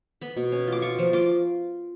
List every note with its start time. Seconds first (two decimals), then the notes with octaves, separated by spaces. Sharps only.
0.21 B3 B5
0.36 B2
0.52 C#4
0.68 F4 D6
0.82 F4 C#6
0.99 F3
1.13 F4 D6